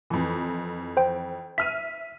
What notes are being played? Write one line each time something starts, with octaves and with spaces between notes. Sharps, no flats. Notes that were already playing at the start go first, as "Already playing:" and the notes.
F2 E3
C5 G5
E5 F6 B6 D#7